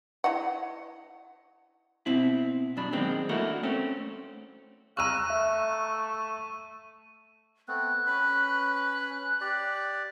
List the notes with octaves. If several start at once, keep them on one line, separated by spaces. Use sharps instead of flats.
E4 D#5 F#5
B2 C4 E4
F#2 B2 D4 B5
F#2 D#3 G#3 A#3 C4
A3 A#3 D4 E4 F#4 A#4
A3 C4 C#4
F5 A#5 C#6 E6 F#6 D#7
A3 E5
A3 B3 C4 F#6
C#4 B4 B5
G4 D5